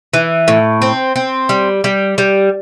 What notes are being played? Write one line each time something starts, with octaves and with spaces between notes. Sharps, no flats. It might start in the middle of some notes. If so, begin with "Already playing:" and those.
E3
A2
C4
C4
G3
G3
G3